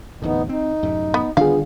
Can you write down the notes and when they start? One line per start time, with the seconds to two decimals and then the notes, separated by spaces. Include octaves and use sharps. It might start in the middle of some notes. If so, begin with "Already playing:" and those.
0.22 D1 E2 A2 B3 D#4
0.49 C4 D#4
0.83 F#2 A2 C3
1.14 B3
1.37 D3 D#3 G3 B3 D4 F4 G#4 F5